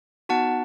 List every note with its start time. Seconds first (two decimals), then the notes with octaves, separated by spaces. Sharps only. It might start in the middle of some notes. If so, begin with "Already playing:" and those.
0.29 B3 D#4 F#4 F#5 A5